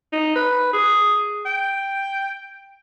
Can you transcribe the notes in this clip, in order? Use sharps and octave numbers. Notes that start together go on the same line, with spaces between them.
D#4
B4
G#4
G5